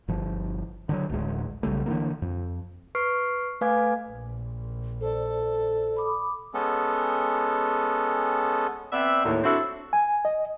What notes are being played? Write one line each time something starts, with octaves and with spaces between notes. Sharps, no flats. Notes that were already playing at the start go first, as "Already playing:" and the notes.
G1 F3
D3 E3 F#3
D1 A1 D2 G#3
B1 C#3 G3 A3
D3 E3 A#3
F2
B4 C#6 F6 C7 D7
A3 B4 F5 G#5 D6 G#6
A#1
A4 C5 D5
B5 D6 D#6
G#3 B3 C#4 A4
B3 C4 D5 E5
D#2 A2
C4 D4 E4 F#4 A4
G#5
D#5